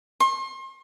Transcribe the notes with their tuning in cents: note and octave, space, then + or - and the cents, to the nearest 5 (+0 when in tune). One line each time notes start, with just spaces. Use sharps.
C6 +35